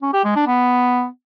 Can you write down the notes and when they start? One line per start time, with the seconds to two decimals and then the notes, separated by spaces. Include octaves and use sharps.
0.02 C#4
0.13 G4
0.25 G#3
0.36 D4
0.47 B3